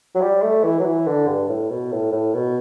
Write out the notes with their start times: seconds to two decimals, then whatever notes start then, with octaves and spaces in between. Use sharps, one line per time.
0.15 F#3
0.22 G3
0.42 A3
0.64 E3
0.80 F#3
0.85 E3
1.07 D3
1.27 G2
1.49 A2
1.70 B2
1.92 A2
2.12 A2
2.34 B2